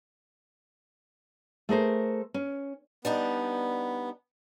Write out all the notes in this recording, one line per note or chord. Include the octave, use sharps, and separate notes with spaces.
A3 G#4 A#4 C5
C#4
G3 B3 D4 D#4